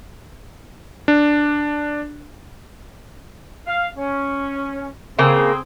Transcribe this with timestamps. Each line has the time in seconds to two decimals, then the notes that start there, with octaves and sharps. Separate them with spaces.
1.08 D4
3.67 F5
3.97 C#4
5.19 C#3 A#3 C4 G#4